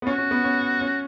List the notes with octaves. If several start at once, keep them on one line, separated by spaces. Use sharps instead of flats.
B3
C#4 F#4
C#4
B3
C#4
C#4